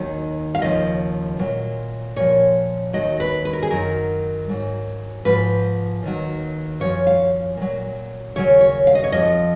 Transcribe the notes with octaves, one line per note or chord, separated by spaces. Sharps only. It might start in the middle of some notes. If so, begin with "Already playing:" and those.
Already playing: D#2 D#3 F#3
F5
D#2 C#3 F3 D#5
A#2 F#3
A#2 F3 C#5
D#2 D#3 F#3 D#5
B4
B4
A#4
G#4
F#2 D#3 F#3 A#4
G#2 F#3
G#2 F3 B4
D#2 D#3 F#3
F#2 F3 C#5
F5
A#2 F#3
D#2 C#3 F#3 C#5
C#5
F5
D#5
C#5
F2 F3 D#5